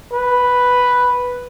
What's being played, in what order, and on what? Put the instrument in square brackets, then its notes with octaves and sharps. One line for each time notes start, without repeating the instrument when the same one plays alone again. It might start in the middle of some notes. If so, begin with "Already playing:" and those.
[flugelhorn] B4